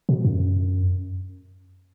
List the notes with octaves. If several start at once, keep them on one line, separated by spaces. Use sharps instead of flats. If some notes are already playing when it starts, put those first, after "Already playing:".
B2
F#2